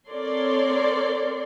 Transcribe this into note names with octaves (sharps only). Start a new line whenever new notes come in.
C4 A4 A#4 C#5 D5 C6